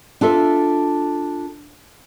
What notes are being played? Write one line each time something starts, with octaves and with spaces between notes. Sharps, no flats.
D4 F4 A4 E5